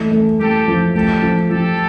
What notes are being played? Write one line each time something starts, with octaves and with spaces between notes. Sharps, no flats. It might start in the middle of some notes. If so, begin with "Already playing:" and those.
Already playing: E3 A3
A3
A3 G4 A4
F3
A3 G4 A4
F3
F3 G4 A4